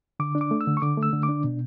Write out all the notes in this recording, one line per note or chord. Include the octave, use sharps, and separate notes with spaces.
D3 D6
D4
D6
A3
E6
D3
C#6
D3 D6
A3
E6
D3
D6
D4
B2